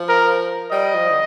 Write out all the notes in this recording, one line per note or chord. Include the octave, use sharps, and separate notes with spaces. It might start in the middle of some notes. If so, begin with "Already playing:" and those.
Already playing: F3
A#4
G3 D#5
F3
D3